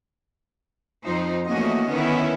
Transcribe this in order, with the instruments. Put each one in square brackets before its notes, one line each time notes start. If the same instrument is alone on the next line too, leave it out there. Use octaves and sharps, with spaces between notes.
[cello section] F2 F3 D#4 C5
E2 A3 A#3 C#4 F#4 D#5
D3 D#3 B3 C#4 E4